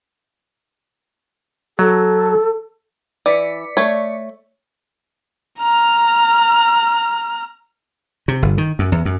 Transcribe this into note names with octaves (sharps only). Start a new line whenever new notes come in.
F#3 A4
E3 D5 B6 C#7
A3 C#5
A#5 F6
C3
G1
D#3
F#2
E2
F#2